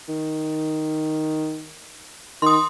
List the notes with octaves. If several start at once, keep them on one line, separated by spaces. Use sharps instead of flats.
D#3
D#3 C6 D#6